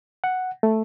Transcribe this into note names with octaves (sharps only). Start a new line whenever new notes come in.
F#5
A3